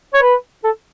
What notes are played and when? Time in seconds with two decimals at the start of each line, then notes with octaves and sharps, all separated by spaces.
0.14 C#5
0.22 B4
0.64 A4